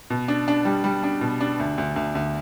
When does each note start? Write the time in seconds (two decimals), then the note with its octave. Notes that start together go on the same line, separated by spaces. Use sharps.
0.10 B2
0.28 D4
0.48 D4
0.65 G3
0.84 G3
1.04 D4
1.21 B2
1.41 D4
1.60 D2
1.78 D2
1.96 D2
2.15 D2